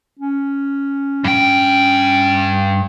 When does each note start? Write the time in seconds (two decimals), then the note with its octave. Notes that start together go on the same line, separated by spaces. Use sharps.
0.19 C#4
1.24 G2 G5